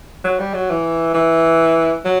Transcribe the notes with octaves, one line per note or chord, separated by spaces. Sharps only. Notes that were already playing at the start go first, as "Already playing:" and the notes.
F#3
G3
F#3
E3
E3
F#3